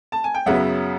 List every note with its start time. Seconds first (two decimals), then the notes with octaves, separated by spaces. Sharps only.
0.12 A5
0.24 G#5
0.34 G5
0.46 F#2 C#3 F#3 B3 E5 F#5